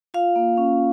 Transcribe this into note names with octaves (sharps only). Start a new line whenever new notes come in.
F4 F5
A#3
C#4